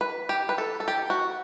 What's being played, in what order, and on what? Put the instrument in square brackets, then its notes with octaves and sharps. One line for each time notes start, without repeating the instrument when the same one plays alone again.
[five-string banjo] B4
G4
B4
A4
A4
G4
F#4